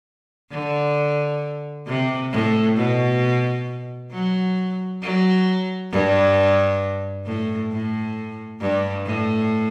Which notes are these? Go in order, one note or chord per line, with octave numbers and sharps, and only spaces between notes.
D3
C3
A2
B2
F#3
F#3
G2
A2
A2
G2
A2